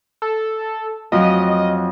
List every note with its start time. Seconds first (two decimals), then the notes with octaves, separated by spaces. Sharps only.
0.22 A4
1.12 F2 F3 F#3 D#5